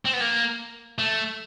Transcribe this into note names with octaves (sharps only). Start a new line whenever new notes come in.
C4
B3
A#3
A3